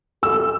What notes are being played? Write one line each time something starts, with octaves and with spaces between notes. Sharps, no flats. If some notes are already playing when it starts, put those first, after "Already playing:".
A4 E6